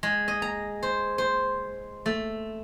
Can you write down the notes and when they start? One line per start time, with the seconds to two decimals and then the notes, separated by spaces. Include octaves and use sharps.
0.03 G#3
0.28 D#5
0.42 A#5
0.83 C5
1.18 C5
2.06 A3